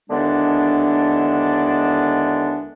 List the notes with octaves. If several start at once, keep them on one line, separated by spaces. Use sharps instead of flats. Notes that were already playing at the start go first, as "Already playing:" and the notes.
D#2 D3 E3 G#3 B3 D4